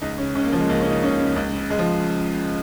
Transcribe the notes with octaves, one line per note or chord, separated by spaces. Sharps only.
C#2 D#4
C#3 C#4
C#2 C#4
A#3
C#3 F3
G#3
C#2 A#3
C#4
C#3
D#4
C#2 C#4
C#3
C#2
C#3
C#2 G#3
F3